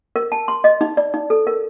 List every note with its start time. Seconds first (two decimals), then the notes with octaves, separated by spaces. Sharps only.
0.16 A#4
0.32 A5
0.48 C6
0.64 D#5
0.81 D#4
0.97 D5
1.14 D#4
1.30 A4
1.47 A#4